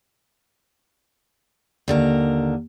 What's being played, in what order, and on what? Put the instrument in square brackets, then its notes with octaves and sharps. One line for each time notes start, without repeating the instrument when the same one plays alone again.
[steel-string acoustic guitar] D#2 D3 A#4